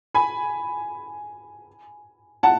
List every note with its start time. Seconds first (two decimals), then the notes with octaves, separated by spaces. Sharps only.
0.15 G#5 B5
2.43 F#5 A5